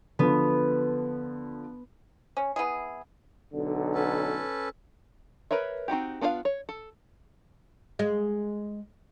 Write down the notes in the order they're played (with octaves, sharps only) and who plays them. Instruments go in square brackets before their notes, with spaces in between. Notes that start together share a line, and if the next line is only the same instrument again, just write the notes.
[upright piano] D3 F3 [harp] B3
[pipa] C#4
B3 E4 G#4
[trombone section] B1 D3
[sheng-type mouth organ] C#4 A4 B4
[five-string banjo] A#4 B4 C#5 E5
C4 D#4 F#4 G4
B3 D4 F4 D5 F5
C#5
A4
[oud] G#3